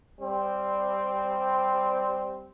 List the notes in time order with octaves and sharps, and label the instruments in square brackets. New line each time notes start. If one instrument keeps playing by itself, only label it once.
[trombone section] G3 C4